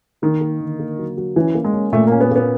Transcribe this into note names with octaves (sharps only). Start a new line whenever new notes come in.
D#3 A#3
A#3
D3
A#3
F#3
F#3
E3 C#4
A#3
G#3
C#4
A#2 A3
A#3 C#4
B3
A#3 B3